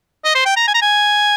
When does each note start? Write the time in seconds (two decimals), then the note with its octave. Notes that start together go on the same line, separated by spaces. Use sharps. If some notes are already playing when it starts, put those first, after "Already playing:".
0.25 D#5
0.35 C5
0.45 G5
0.56 A#5
0.68 G#5
0.74 A#5
0.82 G#5